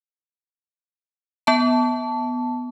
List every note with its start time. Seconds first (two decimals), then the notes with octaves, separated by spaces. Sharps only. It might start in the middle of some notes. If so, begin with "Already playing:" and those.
1.47 B3 A5